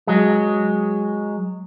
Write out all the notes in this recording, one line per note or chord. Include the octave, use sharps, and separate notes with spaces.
F#3 G#3